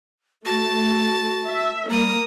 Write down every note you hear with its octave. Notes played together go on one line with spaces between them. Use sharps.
A3 F#4 A5 A6
E5
G3 A#3 A#5 D#6